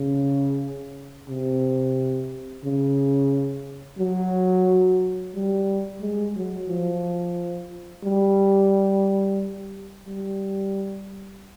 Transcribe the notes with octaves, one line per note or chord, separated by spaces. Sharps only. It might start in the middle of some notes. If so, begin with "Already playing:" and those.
Already playing: C#3
C3
C#3
F#3
G3
G#3
F#3
F3
G3
G3